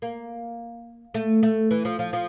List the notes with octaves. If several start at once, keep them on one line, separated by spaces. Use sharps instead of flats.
A#3
A3
A3
E3
F3
F3
F3